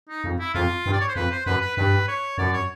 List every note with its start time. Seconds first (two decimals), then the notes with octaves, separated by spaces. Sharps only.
0.09 D#4
0.24 F2
0.39 E4
0.54 F2 F4
0.86 G2
0.93 D5
1.00 C#5
1.08 C5
1.15 F2 B4
1.31 C5
1.46 F#2 B4
1.61 B4
1.77 G2 B4
2.08 C#5
2.38 F#2 D5
2.53 C#5